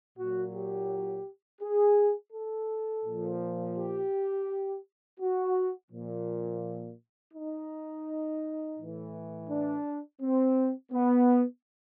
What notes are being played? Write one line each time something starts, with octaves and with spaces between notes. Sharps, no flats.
A#2 F#3 F#4
G4
G#4
A4
A#2 F3
G4
F#4
A#2 F3
D#4
A2 E3
D4
C4
B3